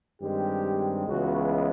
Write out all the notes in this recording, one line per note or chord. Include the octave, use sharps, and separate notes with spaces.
G2 D#3 G#3 C4 G4
C#2 C#3 E3 G#3 B3 F#4